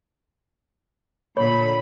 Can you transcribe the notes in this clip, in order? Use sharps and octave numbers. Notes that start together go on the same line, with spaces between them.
A#2 D3 C#5 B5